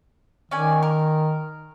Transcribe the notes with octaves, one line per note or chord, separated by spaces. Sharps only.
D#3 C#4 D5 G#5
A#4